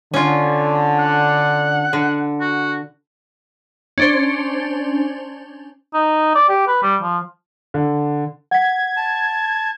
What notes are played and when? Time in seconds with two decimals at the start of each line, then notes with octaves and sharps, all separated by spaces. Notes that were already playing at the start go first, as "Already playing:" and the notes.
0.14 D3 C#4 F4
0.99 F#5
1.93 D3
2.41 F#4
3.98 C#4 D4 C5
5.94 D#4
6.35 D5
6.49 G4
6.68 B4
6.83 G3
7.02 F3
7.74 D3
8.51 F#5 G#6 B6
8.97 A5